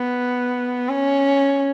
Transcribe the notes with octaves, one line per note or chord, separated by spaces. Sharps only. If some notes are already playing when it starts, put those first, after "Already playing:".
Already playing: B3
C#4